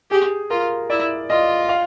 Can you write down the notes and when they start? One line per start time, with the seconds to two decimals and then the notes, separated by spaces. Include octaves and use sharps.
0.11 G4 G#4
0.50 F4 A#4
0.90 E4 D5
1.30 F4 D#5
1.69 F5